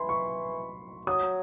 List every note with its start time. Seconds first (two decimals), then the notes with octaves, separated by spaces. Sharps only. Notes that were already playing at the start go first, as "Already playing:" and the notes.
Already playing: E3 B5 C6
0.09 C#6
1.07 F#3 D#6